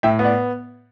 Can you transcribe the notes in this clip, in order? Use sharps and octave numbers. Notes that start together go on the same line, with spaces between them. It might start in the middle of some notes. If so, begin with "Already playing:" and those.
A2 E5 G5
B3
D5 F#5